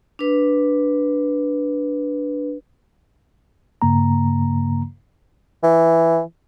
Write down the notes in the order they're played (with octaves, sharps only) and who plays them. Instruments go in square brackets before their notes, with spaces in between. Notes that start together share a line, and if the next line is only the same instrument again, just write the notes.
[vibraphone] D4 B4
[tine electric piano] G2 C#3 A#3 A#5
[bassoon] E3